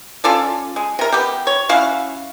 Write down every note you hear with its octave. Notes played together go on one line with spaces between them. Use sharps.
C#4 F4 A4 D5
G#3
C3 A#4
B3 G4
C#5
C#4 E4 F#4 F5